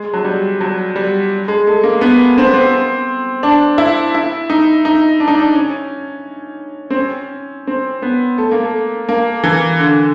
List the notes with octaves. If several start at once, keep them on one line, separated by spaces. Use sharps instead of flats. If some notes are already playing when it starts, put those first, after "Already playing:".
Already playing: G#3
F#3
G3
F#3
G3
G#3
A3
A#3
B3
C4
B3
C4
D4
E4
E4
D#4
D#4
D4
D#4
D4
C#4
C4
C#4
C4
B3
A3
A#3
A3
A#3
E3
D3